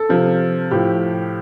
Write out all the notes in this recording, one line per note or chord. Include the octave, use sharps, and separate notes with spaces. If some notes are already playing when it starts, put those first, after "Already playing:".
Already playing: A4
C3 F3
A2 F3 G4